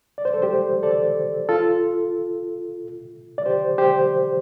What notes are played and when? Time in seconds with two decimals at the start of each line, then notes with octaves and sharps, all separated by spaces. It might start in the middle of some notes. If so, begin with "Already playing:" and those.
0.18 D5
0.25 C5
0.34 A4
0.42 G4 C5
0.83 A4 D5
1.49 F4 A4
3.38 D5
3.46 G4 C5
3.78 G4 C5